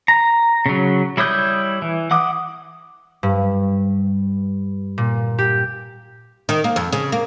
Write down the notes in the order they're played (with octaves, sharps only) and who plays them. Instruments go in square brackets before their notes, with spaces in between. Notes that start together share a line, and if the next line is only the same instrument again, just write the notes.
[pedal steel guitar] A#5
C#3 F#3
G3 E4 C#5 D#6 G6
E3
F#5 D6 D#6
[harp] G2
A#2
G4
[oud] D#3
A#3
F2
C#3
A#3